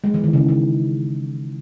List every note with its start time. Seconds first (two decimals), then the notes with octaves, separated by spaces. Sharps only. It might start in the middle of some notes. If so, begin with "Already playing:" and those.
0.04 G#3
0.14 E3
0.24 D#3
0.33 C#3
0.48 C#3